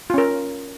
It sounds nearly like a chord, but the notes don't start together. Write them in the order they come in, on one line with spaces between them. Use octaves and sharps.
F4 C#4 A#4